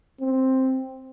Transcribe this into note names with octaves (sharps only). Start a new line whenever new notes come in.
C4